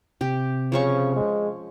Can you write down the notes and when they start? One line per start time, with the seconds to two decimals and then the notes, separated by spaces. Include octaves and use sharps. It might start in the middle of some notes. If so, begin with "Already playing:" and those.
0.21 C3 G4
0.72 C#3 F3 C#4 C#6
1.16 G#3